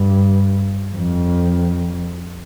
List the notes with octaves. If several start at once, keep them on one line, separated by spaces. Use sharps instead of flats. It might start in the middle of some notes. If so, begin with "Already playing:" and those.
Already playing: G2
F2